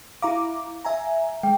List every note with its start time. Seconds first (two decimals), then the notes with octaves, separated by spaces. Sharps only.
0.22 E4 F5 A#5 D6
0.85 E5 G#5 A#5
1.43 G#3 G5